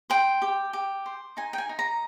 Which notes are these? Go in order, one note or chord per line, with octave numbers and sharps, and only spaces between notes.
C5 G5
G4
G4
C5
D#4 G#5
G5
G#5
D#4
A#5